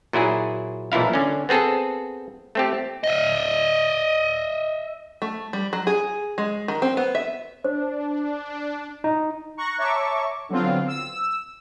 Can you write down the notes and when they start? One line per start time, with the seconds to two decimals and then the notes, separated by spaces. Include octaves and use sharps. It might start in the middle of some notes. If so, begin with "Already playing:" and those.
0.13 A#2 F#3 E4 G#4
0.92 B1 A#2 E3 E4 F5
1.14 D3 C#4
1.49 B3 C4 G#4 A4
2.55 A3 C4 G4
3.04 D#5 E5
5.22 A3
5.53 G3
5.73 F#3
5.87 G#4
6.38 G#3
6.68 D#3
6.82 C4
6.97 B3
7.15 E5
7.64 D4 C5
9.04 D#4
9.57 A#5 C#6 F#6 A#6
9.78 C#5 E5 A5 A#5 C#6 D6
10.49 D3 F#3 B3 C4 F4
10.88 E6